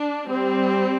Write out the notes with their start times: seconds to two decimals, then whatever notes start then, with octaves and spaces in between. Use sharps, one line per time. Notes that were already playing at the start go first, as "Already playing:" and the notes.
Already playing: D4
0.27 G3 C4